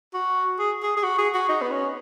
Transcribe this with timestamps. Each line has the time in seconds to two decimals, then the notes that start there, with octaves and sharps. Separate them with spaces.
0.14 F#4
0.59 G#4
0.83 G#4
0.97 G#4
1.03 F#4
1.18 G#4
1.34 F#4
1.49 D#4
1.62 B3
1.71 C#4